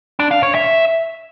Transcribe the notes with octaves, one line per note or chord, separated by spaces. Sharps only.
D4
F5
C#5
E5